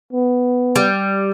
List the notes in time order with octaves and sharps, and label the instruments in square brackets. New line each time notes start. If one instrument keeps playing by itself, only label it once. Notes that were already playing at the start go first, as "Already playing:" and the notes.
[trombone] B3
[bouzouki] G3